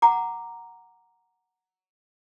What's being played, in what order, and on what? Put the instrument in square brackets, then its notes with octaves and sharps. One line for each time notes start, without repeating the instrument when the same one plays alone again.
[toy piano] F#5 A#5 D6